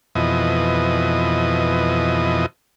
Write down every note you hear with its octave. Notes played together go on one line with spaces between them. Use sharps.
F2 B2 E3 D#5